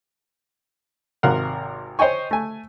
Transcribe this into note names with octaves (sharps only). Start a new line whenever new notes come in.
G#1 C3 A#4 F5 F#5
C5 C#5 D#5 G5 G#5 C#6
A3 G#5